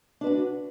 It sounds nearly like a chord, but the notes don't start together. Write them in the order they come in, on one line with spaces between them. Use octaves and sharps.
D4 B4 F#4